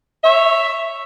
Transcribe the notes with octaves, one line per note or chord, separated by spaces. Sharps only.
C#5 E5